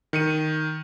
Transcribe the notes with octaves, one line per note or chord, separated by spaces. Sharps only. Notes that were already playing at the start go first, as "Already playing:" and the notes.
D#3 C#7 D#7